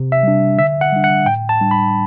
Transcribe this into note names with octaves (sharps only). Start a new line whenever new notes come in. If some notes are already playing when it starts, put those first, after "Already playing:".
Already playing: C3
E5
G3 D4
D3 E5
F#5
G3 D4
F#5
A2 G5
A5
G3 D4
B5